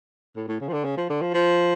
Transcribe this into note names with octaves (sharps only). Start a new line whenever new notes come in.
A2
A2
C#3
F3
D3
C#3
F3
D3
F3
F3